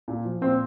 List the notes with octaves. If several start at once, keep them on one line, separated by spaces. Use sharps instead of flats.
A#2
F3
A#2 C4